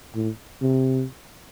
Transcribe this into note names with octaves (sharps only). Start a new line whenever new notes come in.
A2
C3